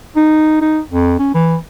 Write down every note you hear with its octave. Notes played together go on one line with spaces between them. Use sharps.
D#4
D#4
F2
C#4
E3